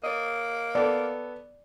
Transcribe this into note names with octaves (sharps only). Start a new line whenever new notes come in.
A#3 C#5 D#5
B3 A4 D5